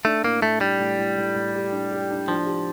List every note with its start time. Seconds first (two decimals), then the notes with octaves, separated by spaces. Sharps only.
0.05 A3 D4
0.24 A2 A#3
0.42 A2 A3
0.61 G3 D4
0.80 A2
0.98 A2
1.17 A2
1.35 A2
1.54 G4
1.72 D4
1.92 G4
2.10 D4
2.28 F3 D4
2.46 G4